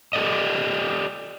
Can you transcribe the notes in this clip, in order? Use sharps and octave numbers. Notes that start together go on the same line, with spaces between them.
G4 A4 D5 D#5